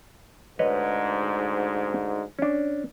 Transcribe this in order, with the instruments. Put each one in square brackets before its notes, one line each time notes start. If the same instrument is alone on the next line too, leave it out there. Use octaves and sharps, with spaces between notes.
[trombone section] D2 G#2 [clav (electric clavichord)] B4 C#5 D#5
[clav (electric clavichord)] C#4 D4